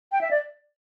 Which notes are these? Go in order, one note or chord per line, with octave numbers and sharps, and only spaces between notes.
G5
E5
D5